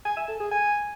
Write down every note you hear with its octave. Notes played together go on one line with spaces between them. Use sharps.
G#5
E5
A4
G#4
G#5